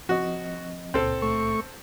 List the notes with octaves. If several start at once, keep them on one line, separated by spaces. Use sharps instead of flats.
F3 C4 F#4 D#5
C#2 A#2 C4 A4
A3 C#6